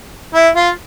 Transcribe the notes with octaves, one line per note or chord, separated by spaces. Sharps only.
E4
F4